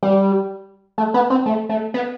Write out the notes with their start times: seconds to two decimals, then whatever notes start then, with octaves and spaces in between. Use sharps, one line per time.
0.03 G3
0.98 A3
1.14 B3
1.30 C4
1.46 A3
1.70 A3
1.94 B3